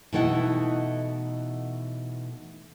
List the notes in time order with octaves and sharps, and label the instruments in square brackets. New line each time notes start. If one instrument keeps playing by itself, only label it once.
[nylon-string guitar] B2 E3 A3 D#4 E4 F#5